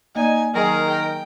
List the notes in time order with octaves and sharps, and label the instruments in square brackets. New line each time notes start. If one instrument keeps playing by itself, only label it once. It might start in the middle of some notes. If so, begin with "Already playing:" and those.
[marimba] A#3 D5 [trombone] D#4 [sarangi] G#5
[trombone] D#3 [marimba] F#3 F6 [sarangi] G#4 [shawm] A#4
[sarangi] G5